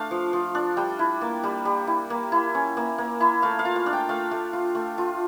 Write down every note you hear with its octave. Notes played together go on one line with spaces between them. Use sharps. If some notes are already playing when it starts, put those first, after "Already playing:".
Already playing: A3 D4 F5
F3
F3
D4
G3 G5
E4
A#3
G3
G3
E4
A#3
E4
C#4
A#3
A#3
E4
A3 F5
F5
F4
F5
D4
G5
A3 F5
A3
F4
A3
F4